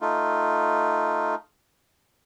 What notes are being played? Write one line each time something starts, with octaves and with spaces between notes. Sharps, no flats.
A3 D#4 F4